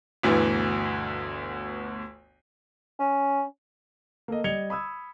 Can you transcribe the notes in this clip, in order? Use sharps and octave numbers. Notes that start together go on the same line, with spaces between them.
G1 D2 B2 E3
C#4
A#3 A4 D#5
G3 D#5 G#6 C#7 F7 G7
B5 D#6 E6 G#6